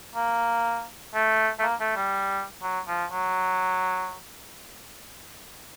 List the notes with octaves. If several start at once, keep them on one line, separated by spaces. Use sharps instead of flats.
A#3
A3
A3
A#3
A3
G3
F#3
F3
F#3